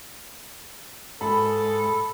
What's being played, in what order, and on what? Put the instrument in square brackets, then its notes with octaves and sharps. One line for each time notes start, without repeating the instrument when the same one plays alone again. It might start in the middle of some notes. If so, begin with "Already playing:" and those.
[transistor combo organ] G#2 [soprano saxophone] A4 [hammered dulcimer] B5